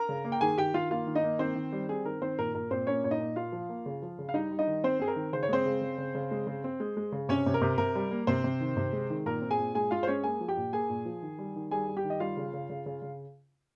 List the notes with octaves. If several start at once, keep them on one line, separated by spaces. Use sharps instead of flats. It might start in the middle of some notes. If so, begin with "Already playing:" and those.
Already playing: A#4 A#5
C#3
A#3
G5
D#3 G#4 G#5
D#3 G4 G5
D#3 F4 F5
A#3 F4 F5
D#3
D#4 D#5
A#3
D#3 C4 C5
D#3
G3
C4 G#4
D#3 A#4
D#3 C4 C5
A#2 A#4
A#2 A#4
A#2 C4 C5
A#3 C#4 C#5
A#2 C#5
D#4 D#5
A#2
A#3 F4 F5
F3
A#3
C#3
F3
C#3
F5
G3 D#4 D#5
G3
D#4 D#5
D#3
C4 C5
C4 G#4
A#4
D#3
C#3 C5
C#5
G#3 C4 C5
C#3
C#3
C#3
C#3
G#3
C#3
C4
G#3
G#3
C#3
C3 C#4 C#5
C3
A#4
C3
C3 A#4
G3
A#3
C3 C4 C5
C3
D#3
C3
G#3
D#3
A#2 A#4 A#5
C4
G#4 G#5
A#2
G#3 G#4 G#5
G#3 F4 F5
C5
G#3 C#4 C#5
A#3 G#4 G#5
F3
G4 G5
A#2
A#3 G#4 G#5
A#2
F3
D#3
G3
D#3
G3 G#4 G#5
G3
G4 G5
D#3
D#5
G3 F4 F5
C#3
C#3
C#3
C#3
C#3